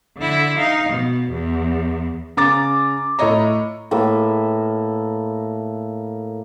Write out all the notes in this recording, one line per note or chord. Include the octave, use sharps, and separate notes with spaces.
D3 E4
D#4 F5
B2
E2
C#3 A#5 D6 A6
A2 A4 C#5 D#5 A#5
A2 A#3 B4 E5